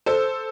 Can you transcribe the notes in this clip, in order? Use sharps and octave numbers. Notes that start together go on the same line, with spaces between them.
A4 C5